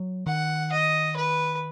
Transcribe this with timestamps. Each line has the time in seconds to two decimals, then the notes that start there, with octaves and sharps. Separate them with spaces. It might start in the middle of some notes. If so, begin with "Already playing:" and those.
Already playing: F#3
0.26 D#3 F#5
0.72 D#5
1.16 B4